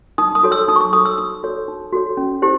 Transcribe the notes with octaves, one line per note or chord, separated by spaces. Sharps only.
D#4 D#6
D#6
F#4 A4 C#5
E6
D#4 D#6
C#6
D6
F#4 A4 C#5 D#6
E6
D#4 E6
F#4 A4 C#5
D#4
F#4 A4 C#5
C#4
E4 G4 C5